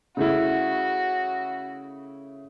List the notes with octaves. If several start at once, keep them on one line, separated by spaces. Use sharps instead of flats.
C#3 A3 E4 F#4